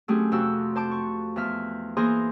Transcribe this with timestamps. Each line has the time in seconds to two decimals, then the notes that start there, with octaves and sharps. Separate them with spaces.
0.08 F#3 A3 C4 C#4 G4 G#4
0.32 F2 C3 F#4 C5 E6
0.76 C5 A5 D6
0.92 C#6
1.36 E2 F3 E5 F6
1.97 E3 A#3 G#4 C5 A#5 C6